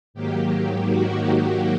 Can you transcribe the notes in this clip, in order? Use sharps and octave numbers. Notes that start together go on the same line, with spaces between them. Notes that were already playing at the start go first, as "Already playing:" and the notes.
G#2 D#3 F#3 A#3 G4
F#4